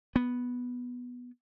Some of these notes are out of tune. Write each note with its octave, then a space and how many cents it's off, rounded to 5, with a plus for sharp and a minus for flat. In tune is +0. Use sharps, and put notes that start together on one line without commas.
B3 -5